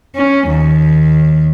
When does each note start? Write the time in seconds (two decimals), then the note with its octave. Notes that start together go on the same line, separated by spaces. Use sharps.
0.15 C#4
0.48 D#2